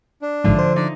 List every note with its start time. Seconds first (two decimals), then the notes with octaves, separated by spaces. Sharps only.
0.22 D4
0.44 A1 G#2 D3 F3
0.59 C5
0.76 D4 D#4 D5